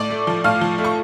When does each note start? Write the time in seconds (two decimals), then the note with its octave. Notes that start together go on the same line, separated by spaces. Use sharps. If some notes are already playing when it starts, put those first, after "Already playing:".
Already playing: A2 D5 D6
0.10 A3
0.27 F3
0.44 A2 F5 F6
0.61 F3
0.78 A3
0.84 C#6